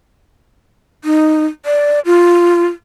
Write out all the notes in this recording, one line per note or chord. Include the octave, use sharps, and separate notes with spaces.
D#4
D5
F4